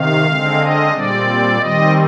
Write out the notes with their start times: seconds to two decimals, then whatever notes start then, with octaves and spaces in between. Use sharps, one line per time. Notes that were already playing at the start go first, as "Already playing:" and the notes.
Already playing: C3 D#3 F5
0.26 D3 G#3 C4
0.59 D#5
0.92 A#2 G3 C4 D5
1.58 D#3 G3 C4 D#5